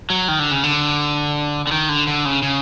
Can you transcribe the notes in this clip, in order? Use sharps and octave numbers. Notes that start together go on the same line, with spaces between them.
F#3
D#3
D3
C#3
D3
D3
D#3
D3
D3
C#3
C#3